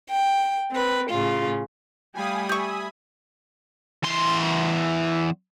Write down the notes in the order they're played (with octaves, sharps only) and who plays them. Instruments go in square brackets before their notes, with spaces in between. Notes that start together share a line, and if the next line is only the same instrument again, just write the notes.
[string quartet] G5
C4 B4
A2 C#3 F4
[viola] G3 A3 [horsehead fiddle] F5 G5 [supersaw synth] G#5 B5 D#6
[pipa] G4 C#6 [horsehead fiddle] E5
[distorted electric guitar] E2 C6